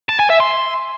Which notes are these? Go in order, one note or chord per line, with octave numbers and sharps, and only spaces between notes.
A5
G#5
E5
C6